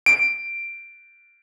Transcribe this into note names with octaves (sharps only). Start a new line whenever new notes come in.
D7